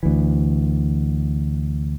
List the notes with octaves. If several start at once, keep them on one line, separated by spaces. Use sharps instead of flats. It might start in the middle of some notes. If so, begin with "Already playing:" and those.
D2 E3